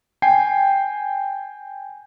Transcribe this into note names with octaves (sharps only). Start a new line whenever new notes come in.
G5 G#5 C7